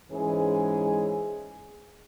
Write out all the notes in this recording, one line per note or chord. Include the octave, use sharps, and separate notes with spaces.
G#2 E3 G#3 C#4 G#4